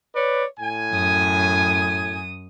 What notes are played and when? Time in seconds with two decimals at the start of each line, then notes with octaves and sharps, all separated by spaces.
0.14 B4 C#5 D5
0.60 A2 G#5
0.93 F#2 D#6